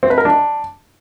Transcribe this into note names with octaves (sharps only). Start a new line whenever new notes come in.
C4
B4
A#4
D4